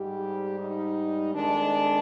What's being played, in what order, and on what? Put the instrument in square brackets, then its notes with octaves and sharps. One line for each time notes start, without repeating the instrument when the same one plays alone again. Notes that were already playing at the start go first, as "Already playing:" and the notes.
Already playing: [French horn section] G#2 G3 G4
D#4
F2 D#3 G#3 D4